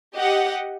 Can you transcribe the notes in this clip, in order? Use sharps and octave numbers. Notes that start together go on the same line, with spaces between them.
G4 D#5 F#5